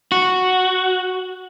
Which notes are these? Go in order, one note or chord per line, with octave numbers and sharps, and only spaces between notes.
F#4